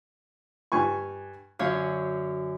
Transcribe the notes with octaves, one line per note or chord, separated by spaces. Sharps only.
G2 G#5 C#6
F#2 D3 C#5 F5